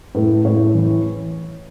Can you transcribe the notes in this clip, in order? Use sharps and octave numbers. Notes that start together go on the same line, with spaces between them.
A2 B4
A2 C#5
E3